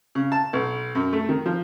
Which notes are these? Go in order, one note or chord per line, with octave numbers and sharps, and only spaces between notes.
C#3
A5
B1
F#2
A3
D#3
F3